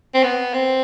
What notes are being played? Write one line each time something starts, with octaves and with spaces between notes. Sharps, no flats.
C4
B3
C4